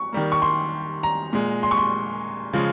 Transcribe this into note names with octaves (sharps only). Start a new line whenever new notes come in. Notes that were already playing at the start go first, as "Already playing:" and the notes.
Already playing: C#6
D#3 G3 A#3
C#6
C6
A#5
A#2 G#3
C6
C#6
C6
C#3 F3 G#3